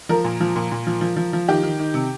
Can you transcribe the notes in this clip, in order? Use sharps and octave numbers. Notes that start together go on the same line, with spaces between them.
F3 A#4
A#2
F3
A#2
A#2
F3
F3
F3
F3
D#3 G4
D#3
D#3
C3